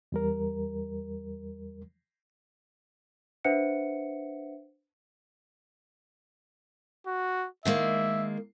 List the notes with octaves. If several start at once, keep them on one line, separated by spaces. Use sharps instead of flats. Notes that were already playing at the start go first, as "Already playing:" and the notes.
E2 G3 A#4
D4 B4 C5 E5 F#5 C#7
F#4
D#3 G#3 A#3 E5